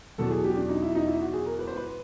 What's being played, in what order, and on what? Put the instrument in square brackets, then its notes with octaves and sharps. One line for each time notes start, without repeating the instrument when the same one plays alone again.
[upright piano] E2 B2 F#3 A4
G#4
G4
D4
D#4
E4
D#4
E4
F#4
G#4
A#4
B4
C5
B4